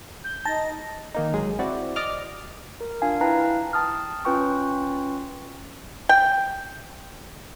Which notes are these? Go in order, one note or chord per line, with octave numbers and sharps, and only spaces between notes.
G6
D#4 A5 A#6
D#3 A#3 D#4
A1 F#3 G#3 G#4
C4 E4 F#4 D5
D5 D#5 D6 F6
A#4
D4 F4 F5 G#5
E4 B4 F5 G5 A5 A#5
G5 A5 D#6 F6
C#4 F4 B4 G5 C#6
G5